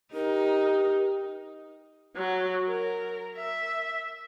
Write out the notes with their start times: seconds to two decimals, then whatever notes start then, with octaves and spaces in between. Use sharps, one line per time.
0.14 D#4 G4 A#4
2.16 F#3
2.66 A#4
3.37 E5